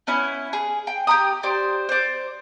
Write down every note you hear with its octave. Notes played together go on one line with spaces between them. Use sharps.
B3 C#4 E4
G#4
G5
G4 G5 A#5 D#6
G4 C5 D5
C5 D5